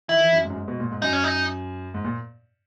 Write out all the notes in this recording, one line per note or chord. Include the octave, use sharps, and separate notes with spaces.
D#3 E4
E3
F#2
G#2
F#2
G#2
B2
A#2
G#2
F#2 D#4
C#4
D#4
G#2
A#2